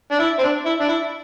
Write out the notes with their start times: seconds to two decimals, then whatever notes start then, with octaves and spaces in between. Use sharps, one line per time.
0.11 D4
0.19 E4
0.39 C4
0.43 D4
0.65 E4
0.80 D4
0.88 E4